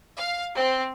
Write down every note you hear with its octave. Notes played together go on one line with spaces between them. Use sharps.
F5
C4